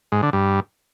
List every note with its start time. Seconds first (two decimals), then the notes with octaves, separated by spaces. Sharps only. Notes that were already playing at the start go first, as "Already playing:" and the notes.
0.12 G#2
0.23 D3
0.33 G2